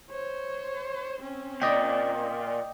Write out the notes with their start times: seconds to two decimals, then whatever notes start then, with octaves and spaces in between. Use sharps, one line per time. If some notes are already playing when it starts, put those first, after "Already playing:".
0.11 C5 C#5
1.21 C4 C#4
1.62 A#2 D5 D#5 G5